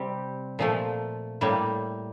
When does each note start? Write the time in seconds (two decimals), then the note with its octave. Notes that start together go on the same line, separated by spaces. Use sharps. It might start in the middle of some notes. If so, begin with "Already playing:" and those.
Already playing: C3 G3 C4 G4
0.59 A#2 F3 A3
1.41 A2 G3 A#3